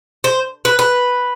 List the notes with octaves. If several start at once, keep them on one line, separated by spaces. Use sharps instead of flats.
C5
B4
B4